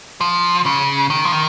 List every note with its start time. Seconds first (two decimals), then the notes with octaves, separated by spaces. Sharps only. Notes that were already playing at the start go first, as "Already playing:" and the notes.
0.21 F3
0.66 C#3
1.10 D#3
1.25 F3
1.32 D#3